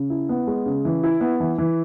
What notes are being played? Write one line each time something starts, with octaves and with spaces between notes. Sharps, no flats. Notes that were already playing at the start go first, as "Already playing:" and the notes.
Already playing: C#3
E4
B3
G#3
C#3
E3
E4
B3
E3
E3